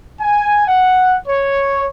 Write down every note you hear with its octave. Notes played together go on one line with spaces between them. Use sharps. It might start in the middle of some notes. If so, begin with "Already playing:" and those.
G#5
F#5
C#5